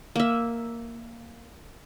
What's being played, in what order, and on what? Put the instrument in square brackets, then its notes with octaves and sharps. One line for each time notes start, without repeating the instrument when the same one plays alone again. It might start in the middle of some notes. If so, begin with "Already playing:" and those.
[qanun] A#3 E5